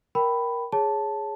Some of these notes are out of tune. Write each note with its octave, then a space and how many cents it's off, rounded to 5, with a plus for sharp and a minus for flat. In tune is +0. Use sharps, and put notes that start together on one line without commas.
A#4 +10 G5 -10 B5 +5
G#4 +0 C#5 +0 A5 +0